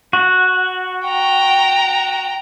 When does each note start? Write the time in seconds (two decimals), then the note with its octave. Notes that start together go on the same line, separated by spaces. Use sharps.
0.13 F#4
1.08 G5 A#5